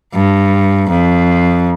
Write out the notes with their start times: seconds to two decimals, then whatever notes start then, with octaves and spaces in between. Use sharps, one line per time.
0.14 G2
0.89 F2